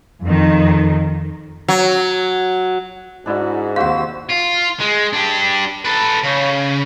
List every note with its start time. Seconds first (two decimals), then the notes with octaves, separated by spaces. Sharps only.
0.24 F2 D#3
1.68 F#3
3.26 G#2 D4 E4 F#4
3.76 D#2 C3 F#4 C5 F5 F#5 E6
4.29 F4
4.80 G#3
5.13 D4 G4
5.85 A4 B4
6.24 C#3